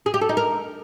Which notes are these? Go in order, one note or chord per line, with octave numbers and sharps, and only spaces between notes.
G#4
G4
A4
D#4
A#4